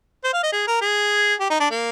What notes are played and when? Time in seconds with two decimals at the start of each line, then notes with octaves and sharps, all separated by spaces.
0.24 C5
0.33 F5
0.43 D#5
0.52 G#4
0.67 A#4
0.82 G#4
1.40 G4
1.50 D#4
1.60 D4
1.71 A#3